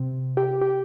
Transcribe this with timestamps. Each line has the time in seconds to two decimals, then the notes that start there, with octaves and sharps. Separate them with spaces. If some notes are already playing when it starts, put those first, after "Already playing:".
Already playing: C3
0.37 G4
0.61 G4